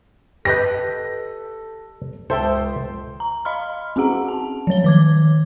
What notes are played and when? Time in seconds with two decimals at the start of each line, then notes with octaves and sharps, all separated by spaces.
0.45 G4 A4 B4 D#5 A#6
2.30 C#2 A4 C5 E5 G5
3.20 A#5
3.45 D#5 F5 B5 C6 F6
3.96 C4 C#4 F#4 G#4 F#5 A#5
4.28 A5
4.67 F3 F#3 C#5 G7
4.84 D#3 D6 G#6